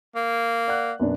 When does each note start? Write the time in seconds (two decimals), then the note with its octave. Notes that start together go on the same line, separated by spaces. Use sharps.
0.15 A#3
0.68 D5 F#5 F#6
0.99 F#2 B2 D4